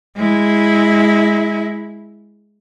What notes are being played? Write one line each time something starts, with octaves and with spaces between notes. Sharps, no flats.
G#3 E4